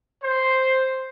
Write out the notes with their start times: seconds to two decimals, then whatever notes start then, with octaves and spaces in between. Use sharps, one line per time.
0.22 C5